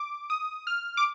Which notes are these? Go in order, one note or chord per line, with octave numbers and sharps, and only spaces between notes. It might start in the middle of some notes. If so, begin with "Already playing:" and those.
Already playing: D6
D#6
F6
D6